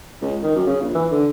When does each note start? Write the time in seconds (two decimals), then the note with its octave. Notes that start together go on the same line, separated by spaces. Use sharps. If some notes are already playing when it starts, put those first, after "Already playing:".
0.22 C#2
0.43 D#3
0.56 F#2
0.67 C#3
0.81 A#1
0.94 E3
1.11 D3